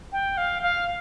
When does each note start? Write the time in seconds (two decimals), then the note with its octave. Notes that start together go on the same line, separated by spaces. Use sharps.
0.12 G5
0.37 F5
0.62 F5